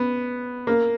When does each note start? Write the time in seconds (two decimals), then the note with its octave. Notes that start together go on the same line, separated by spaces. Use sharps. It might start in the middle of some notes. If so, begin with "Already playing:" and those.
Already playing: B3
0.67 A#3